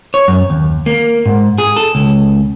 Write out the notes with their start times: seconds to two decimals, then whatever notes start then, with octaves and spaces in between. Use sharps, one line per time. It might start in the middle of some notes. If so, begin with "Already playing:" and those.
0.14 C#5
0.28 F#2
0.50 D#2
0.86 A#3
1.26 G#2
1.58 G#4
1.76 A4
1.95 C#2